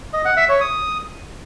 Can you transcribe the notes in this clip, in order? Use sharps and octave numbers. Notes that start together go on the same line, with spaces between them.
D#5
F#5
E5
C#5
D#6